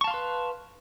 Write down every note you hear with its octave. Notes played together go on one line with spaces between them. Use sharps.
B4 F5 A5 C6 C#6